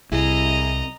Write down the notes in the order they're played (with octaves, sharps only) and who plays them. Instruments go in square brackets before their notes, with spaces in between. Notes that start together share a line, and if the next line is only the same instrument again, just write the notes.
[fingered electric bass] C2 [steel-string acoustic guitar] E4 G#4 [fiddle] D#5 A#5